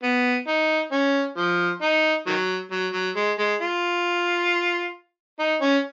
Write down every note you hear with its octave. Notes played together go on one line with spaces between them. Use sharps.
B3
D#4
C#4
F3
D#4
D#3 F#3
F#3
F#3
G#3
G#3
F4
D#4
C#4